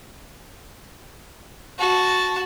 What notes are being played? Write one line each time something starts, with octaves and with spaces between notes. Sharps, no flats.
F#4 A5